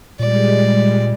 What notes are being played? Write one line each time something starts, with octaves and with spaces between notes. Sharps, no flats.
A#2 G3 G#3 D5